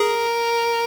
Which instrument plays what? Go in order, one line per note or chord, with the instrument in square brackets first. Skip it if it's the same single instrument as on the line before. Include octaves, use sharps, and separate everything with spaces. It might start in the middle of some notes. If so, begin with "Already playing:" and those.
Already playing: [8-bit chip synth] G#4 [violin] A#4